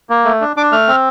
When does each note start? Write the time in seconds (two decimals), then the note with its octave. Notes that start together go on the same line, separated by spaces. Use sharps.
0.09 A#3
0.25 A3
0.41 D4
0.56 D4 D6
0.72 A3 F6
0.88 C4